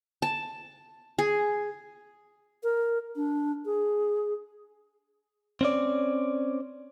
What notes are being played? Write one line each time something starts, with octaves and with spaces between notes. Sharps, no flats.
A5
G#4
A#4
D4
G#4
C4 C#4 D5